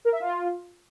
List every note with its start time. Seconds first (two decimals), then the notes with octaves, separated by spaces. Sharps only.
0.05 A#4
0.12 E5
0.20 F4